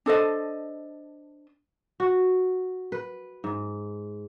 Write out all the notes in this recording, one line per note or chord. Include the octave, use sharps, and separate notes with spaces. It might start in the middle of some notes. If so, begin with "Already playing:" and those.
D4 A4 C5 D#5
F#4
B4
G#2